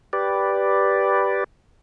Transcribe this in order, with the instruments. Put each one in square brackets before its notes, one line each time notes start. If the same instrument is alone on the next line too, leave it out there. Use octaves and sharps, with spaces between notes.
[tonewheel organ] G4 B4 D5